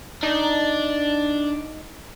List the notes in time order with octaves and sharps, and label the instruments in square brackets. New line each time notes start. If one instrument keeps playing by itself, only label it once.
[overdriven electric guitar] D4 [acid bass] D#4